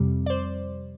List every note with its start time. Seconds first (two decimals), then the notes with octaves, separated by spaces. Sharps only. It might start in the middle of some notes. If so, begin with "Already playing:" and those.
Already playing: F2 C3 G3
0.26 D5
0.30 C5